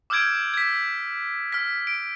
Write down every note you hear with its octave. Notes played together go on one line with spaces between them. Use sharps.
D6 E6 F6 G6 G#6 D7
G#6 B6
F6 B6
D7